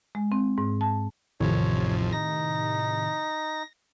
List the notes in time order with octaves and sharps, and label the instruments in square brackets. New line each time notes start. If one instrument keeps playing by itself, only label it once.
[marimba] G#3
C4
G#2
A5
[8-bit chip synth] A1 F2 F3 [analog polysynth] A2 C3 D#3 [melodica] C#5
[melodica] D#4 [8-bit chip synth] A#6